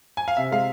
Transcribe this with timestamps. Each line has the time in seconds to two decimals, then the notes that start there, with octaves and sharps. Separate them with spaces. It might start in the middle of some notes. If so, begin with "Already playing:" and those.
0.17 G#5
0.28 F5
0.37 C3 E5
0.52 G#3 F5